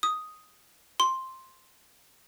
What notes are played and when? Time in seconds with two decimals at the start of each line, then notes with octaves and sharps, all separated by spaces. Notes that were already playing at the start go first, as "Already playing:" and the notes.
0.03 D#6
1.00 C6